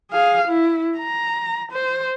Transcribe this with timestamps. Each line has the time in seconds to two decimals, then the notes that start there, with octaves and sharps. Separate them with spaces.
0.11 G#4 F5
0.47 E4
0.98 A#5
1.72 C5